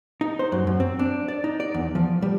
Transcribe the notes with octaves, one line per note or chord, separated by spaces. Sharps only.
D#4
C5
F#2
F#2
C4
D4
D5
D#4
D5
E2
F3
G3